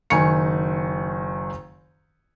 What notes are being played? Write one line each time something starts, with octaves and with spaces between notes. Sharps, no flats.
F#1 D#3 G#5 C#6 C#7